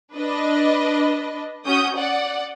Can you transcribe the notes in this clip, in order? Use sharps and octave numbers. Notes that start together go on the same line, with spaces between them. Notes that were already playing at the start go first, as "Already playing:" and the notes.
D4 B4 D#5
C#4 F#4 D#6 G6
D5 F#5